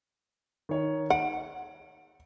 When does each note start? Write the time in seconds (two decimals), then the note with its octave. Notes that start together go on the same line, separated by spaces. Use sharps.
0.69 D#3 C#5
1.10 F#5 D7